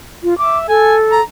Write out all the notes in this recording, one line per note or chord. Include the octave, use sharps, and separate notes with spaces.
F4
E5 D6
A4 G#5
A#5